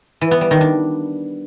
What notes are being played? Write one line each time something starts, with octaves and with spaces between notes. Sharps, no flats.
E3
B3
G3
D#3
D4